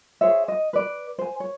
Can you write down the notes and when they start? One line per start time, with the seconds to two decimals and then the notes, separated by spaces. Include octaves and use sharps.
0.21 G#4 C5 C#5 E5
0.48 D#5
0.73 B4 D5
1.18 C5 G#5
1.40 C#5